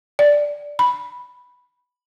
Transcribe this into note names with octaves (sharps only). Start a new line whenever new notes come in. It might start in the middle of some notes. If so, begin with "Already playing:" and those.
D5
B5